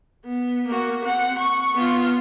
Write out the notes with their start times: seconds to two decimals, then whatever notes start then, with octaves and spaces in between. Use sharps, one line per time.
0.25 B3
0.67 A#3 F#4
1.05 C4 F#5
1.39 C#6
1.74 B3 F4